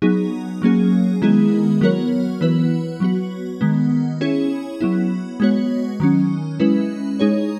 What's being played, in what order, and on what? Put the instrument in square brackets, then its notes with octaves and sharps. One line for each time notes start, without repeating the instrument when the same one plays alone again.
[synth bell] F#3 B3 D#4 G#4
F#3 A#3 C#4 G#4
D#3 G#3 B3 E4 G#4
F#3 B3 F#4 A#4 C#5
E3 B3 E4 B4
F#3 B3 F#4
D#3 G#3 B3
C#4 E4 G#4 C#5
F#3 B3 E4
G#3 B3 F#4 C#5
D#3 F#3 C#4
G#3 C#4 E4 B4
G#3 D#4 G#4 C#5